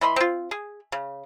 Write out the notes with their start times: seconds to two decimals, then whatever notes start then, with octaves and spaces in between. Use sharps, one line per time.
0.01 E3 D#5 B5 C6
0.16 C4 F4
0.51 G#4
0.92 C#3